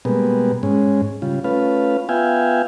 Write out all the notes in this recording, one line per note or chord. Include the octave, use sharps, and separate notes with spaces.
B2 G3 G#3 A#3 B3
G#2 G#3 C#4
C#3 G3 F4
A3 C#4 F4 B4 F5
B3 F4 E5 F5 G5 G#5